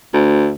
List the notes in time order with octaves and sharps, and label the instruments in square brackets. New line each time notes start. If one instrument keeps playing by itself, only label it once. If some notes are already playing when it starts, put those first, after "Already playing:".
[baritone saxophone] D2